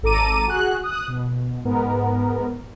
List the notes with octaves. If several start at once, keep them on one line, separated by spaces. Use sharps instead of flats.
G#1 A4 A#5 D6 D#7
F#4 G#4 F#6
D#6 F#6
B2
G#2 B3 A#4